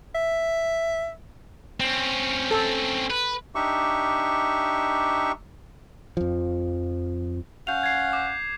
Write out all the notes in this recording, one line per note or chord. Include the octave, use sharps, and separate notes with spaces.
E5
C4 C#4
A4
B4
D4 D#4 G4 E5 C#6
F2 F3
C#4 F5 F#5 G6 F7
G#6 C7
D6